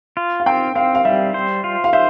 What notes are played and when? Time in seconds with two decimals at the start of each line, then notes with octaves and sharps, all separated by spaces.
0.17 F4
0.40 F5
0.46 C4 G5
0.75 C4 F5
0.95 F5
1.05 G3 E5
1.34 C5
1.64 F4
1.84 F5
1.93 C5 E5